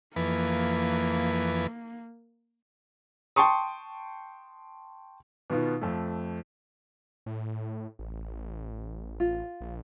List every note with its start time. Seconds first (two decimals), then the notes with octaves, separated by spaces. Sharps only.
0.16 F2 E3 A#3 B4
3.36 G5 A5 C6 C#6 D#6
5.50 B2 D#3 B3 F4
5.81 F2 A3
7.26 A2
7.99 A1
9.20 F4
9.61 A#1